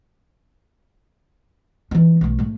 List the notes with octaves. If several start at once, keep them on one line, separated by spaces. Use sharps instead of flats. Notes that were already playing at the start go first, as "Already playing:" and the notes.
E3 D#4
B1 A3
G#2 A3